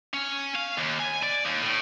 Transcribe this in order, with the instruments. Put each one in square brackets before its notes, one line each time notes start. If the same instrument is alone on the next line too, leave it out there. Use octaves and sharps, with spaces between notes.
[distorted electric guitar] C#4
F5
D#2
G#5
D5
D#2
A2